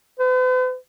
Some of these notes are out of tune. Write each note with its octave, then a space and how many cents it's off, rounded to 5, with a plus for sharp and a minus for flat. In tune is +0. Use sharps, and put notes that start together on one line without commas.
B4 +45